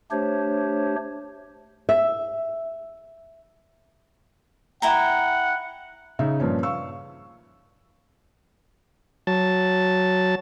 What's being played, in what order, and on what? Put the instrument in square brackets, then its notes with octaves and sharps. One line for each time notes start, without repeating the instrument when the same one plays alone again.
[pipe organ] A3 D4 G4 C5 C#5
[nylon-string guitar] E5
[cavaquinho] E4 G5 A#5 [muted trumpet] F#5
[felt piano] C#3 D#4 E5
G2 A#2 F3 C#4
F5 C#6 E6
[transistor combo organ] F#3 A5